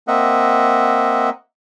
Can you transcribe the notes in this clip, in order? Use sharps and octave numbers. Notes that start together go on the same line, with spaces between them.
A#3 C4 D#5 E5 F#5